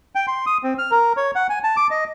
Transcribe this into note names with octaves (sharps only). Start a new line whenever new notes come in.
G5
C6
D#6
C4
F6
A#4
C#5
F#5
G#5
A5
D6
D#5